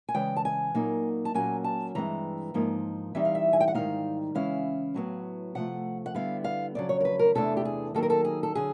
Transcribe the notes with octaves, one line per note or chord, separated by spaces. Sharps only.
G#5
C#3 E3 G#3 G5
A5
G#5
A#2 F#3 A#3 D#4
A5
A#2 F#3 A#3 C#4 G#5
A5
G2 E3 G#3 C4 A#5
G#2 F3 A#3 D#4
E3 G3 C4 D#4 E5
F5
E5
G#5
G5
F#5
G#2 D#3 G3 C4 D#4 F5
C#3 E3 G#3 C#4 E4 F5
A2 F#3 B3
C3 F3 A3 F#5
F#5
D3 G3 B3 E4 F5
F5
F2 C#3 F#3 D5
C#5
A#4
B4
A#4
E2 C3 E3 A3 D4 A4
G4
G#4
D#3 F#3 A#3 D#4 A4
A#4
A4
G#4
A4
D3 F#3 G#4